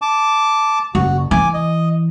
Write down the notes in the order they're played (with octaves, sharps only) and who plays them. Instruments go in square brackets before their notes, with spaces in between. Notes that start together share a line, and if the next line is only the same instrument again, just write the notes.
[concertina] A5 D6
[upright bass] F#1 [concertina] F#4
[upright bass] E3 [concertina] G#5 D6
[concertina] D#5